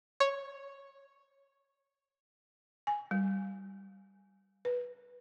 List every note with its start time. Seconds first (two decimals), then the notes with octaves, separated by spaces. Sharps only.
0.20 C#5
2.87 G#5
3.11 G3
4.65 B4